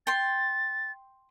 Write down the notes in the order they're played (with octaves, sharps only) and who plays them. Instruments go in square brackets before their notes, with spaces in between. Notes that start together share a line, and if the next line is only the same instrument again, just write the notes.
[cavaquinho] G5 C6 [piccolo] A6